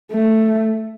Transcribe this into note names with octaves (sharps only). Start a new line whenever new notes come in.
A3